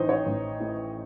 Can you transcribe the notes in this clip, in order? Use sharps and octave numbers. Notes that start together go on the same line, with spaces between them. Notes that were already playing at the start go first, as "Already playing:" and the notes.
Already playing: A1 E3 D#4 C5 D#5
C#5
A1
A2